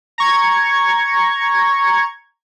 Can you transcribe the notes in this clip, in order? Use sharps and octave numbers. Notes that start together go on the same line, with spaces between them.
A#5 C#6 G#6